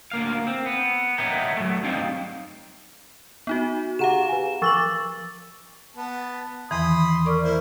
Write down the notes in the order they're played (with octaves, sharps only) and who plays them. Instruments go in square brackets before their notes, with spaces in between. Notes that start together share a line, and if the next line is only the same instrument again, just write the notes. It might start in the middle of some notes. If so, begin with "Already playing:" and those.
[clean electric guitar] D2 A#3 F5
C4
B3
C#5 D#5 E5 F#5 G5 A#5
F#3 A3
G2 C4 D#4 F5 G5
[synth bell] B3 D#4 F#4
[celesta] G4 G#4 F#5 [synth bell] F5 A#5 E7
[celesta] B4 G#5
[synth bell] F3 D6 F#7 [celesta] C#6 E6 A6
[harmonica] B3 A5
[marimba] E2 D#3 E3 [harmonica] B5 C6 D#6
[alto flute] A#4 [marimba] D5 C#6 D6
[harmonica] A#3 E4 C5